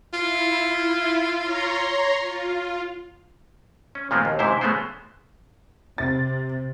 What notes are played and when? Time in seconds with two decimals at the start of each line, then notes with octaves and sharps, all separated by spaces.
0.13 E4 F4
1.41 C#5 A#5 C6
2.19 F4
3.95 C#4
4.11 A#2 D#3 F3 G#3 B3 C4
4.25 D#2
4.39 G#2 C3 E4 C5
4.61 C#3 G#3 A3 B3 C#4 C5
5.98 C3 A6